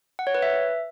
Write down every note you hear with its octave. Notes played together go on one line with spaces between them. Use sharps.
F#5
C#5
B4
E5